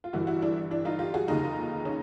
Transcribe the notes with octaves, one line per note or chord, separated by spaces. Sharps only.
F4
G1 G2 E3 E4 F#4
E4 F#4
D4 E4
D4 E4
D#4 F4
F4 G4
F#4 G#4
F1 D#2 C#3 D#4 F4
C#4 D#4